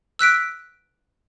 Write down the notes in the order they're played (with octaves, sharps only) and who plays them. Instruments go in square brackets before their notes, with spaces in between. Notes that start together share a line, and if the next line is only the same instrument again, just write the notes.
[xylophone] E6 F#6 B6 D7